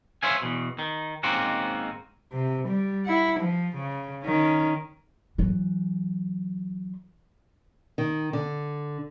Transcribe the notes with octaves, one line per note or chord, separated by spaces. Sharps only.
C5 C#5 E5 F5 G#5
E2 G2 B2
D#3
G#2 D#3 A#3 C4 C#4 F#4
C3
G3
E4 F#5
F3
C#3
D#3 C#4
E3 F#3
D#3
D3